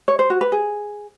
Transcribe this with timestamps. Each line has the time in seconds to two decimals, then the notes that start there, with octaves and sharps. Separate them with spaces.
0.08 C#5
0.19 C5
0.30 F#4
0.41 B4
0.52 G#4